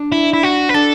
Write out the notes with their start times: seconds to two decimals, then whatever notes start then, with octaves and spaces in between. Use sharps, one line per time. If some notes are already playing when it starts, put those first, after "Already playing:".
Already playing: D4
0.12 E4
0.33 E4
0.43 F#4
0.69 B4
0.74 D4 A4